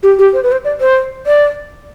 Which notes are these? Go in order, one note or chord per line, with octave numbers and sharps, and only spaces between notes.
G4
G4
C5
B4
C5
D5
C5
D5